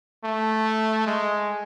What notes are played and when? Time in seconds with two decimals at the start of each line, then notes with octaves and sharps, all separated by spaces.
0.25 A3
1.07 G#3